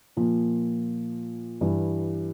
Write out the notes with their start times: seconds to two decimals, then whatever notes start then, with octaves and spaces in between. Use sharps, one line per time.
0.17 A#2 F3 A#3
1.61 G2 E3 G3